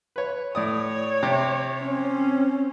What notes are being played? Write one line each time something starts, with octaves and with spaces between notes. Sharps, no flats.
B4 C#5
A2 C#5 D5 D#6
C3
C4 C#4